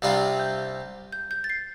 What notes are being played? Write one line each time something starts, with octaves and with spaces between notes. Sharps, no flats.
C2 C3 G3 D4 F4 F5
G6
G6
G6
A6
C7